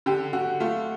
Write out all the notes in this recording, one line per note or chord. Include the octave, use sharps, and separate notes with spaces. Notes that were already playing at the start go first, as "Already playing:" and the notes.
D3 G4
D3 F#4
A3 F4